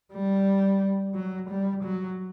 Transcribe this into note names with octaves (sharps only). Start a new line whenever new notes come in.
G3
F#3
G3
F#3